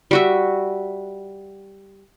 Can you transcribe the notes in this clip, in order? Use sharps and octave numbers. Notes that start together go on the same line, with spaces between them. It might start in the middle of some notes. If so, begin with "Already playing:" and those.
G3 F#4 E5